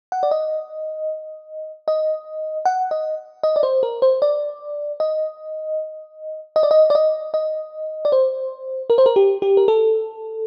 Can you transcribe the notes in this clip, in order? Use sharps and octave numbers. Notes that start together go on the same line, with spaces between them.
F#5
D5
D#5
D#5
F#5
D#5
D#5
D5
C5
A#4
C5
D5
D#5
D#5
D5
D#5
D5
D#5
D#5
D5
C5
A#4
C5
A#4
G4
G4
A#4
A4